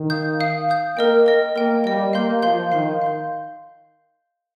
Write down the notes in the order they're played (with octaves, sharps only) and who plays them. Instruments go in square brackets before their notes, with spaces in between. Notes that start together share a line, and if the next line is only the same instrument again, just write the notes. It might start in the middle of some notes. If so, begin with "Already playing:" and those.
Already playing: [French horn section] D#3
[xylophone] F5 D#6 G6
F5 D#6 G6
F5 D#6 G6
[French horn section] A#3 [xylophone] A#4 D#5 G5
[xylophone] A#4 D#5 G5
[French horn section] A#3 [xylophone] A#4 D#5 G5
[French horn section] G3 [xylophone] A#4 D#5 G5
[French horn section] A#3 [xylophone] F5 C6 G6
[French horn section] F3 [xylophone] F5 C6 G6
[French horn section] D#3 [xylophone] F5 C6 G6
[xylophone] F5 C6 G6